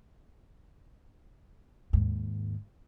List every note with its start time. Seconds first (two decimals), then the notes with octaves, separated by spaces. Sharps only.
1.93 D#2 G#2